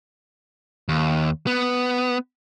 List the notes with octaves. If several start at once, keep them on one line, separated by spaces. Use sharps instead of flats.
D#2
B3